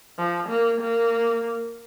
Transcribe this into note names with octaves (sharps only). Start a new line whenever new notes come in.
F3
A#3
A#3